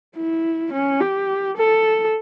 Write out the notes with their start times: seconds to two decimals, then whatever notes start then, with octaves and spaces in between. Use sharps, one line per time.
0.17 E4
0.73 C#4
1.01 G4
1.57 A4